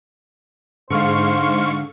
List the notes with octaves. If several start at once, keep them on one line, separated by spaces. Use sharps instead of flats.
G#2 D3 C5 F5 C#6